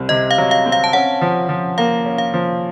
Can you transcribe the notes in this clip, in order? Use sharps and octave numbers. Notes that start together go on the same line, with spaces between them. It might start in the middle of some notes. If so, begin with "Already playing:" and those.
Already playing: C2 C4
C3 D#5
F5
F#3
F5
C4
F5
A5
C#4 F#5
F3
F3
A#3 F5
C#4
F5
F3